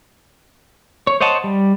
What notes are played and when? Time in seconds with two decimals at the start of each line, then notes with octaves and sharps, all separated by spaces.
1.07 C#5
1.21 C5 C#5 D#5 F#5 A5
1.44 G3